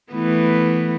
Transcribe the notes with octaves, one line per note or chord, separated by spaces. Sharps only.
E3 A3 B3